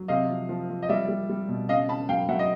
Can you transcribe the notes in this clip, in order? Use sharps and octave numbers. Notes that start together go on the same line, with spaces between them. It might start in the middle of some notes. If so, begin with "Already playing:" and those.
Already playing: F#3
C3 D#5 F5
F3
F3
F3
D#5
G3 D5 E5
G3
G3
B2
C#3 D#5 F5
C#3 A5 B5
F#3 F5 G5
F#3 E5 F#5
D#5